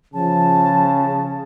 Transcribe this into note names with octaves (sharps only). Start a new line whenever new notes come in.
C#3 F3 A5